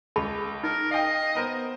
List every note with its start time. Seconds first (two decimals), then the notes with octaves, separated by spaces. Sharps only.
0.16 C#2 G#4 A5 B5
0.64 D#4 A#4
0.91 D#5 F5 G5
1.35 B3 A#4 C5